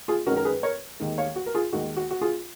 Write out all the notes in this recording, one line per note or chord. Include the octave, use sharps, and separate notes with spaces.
F4 G#4
F#2 D#3 G#3 C#4 F#4 A#4
A#4
G#4 B4
A#4 C#5
D#2 D#3 G#3
C#5 F5
F#4
A#4
F4 G#4
D#2 D#3 G#3 F#4
F#4
F#4
F4 G#4